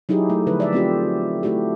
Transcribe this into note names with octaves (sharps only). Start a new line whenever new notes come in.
F#3 D#4 E4 G4 G#4
A3
D3 F3 B4
D5 E5
A3 C4 F4 G4
A3 E4 F#4 G4